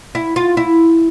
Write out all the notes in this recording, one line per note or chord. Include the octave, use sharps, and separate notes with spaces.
E4
F4
E4